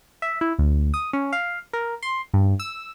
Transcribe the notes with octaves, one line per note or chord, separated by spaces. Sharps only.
E5
E4
D2
D#6
C#4
F5
A#4
C6
G2
E6